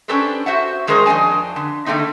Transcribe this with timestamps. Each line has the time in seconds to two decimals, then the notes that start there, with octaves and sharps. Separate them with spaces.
0.08 C#4 D4 G4 A4 B4 C5
0.46 F#4 C5 E5 F#5
0.87 D#3 G#3 G#4 A#4 C5
1.06 F2 D4 D#5 G#5 A5
1.56 D3
1.86 D3 A3 A#3 C4 D#4